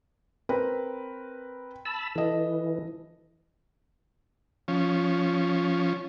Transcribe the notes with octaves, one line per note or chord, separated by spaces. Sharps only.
C4 A#4 B4
A5 B5 E6
E3 A4 D#5
F3 C#4